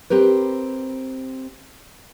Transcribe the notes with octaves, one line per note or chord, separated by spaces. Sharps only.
C4 G4 A#4 B4